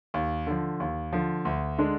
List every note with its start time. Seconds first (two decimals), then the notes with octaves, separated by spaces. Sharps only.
0.14 D#2
0.47 D3 F3
0.80 D#2
1.13 D3 F3
1.45 D2
1.78 D3 G#3 D4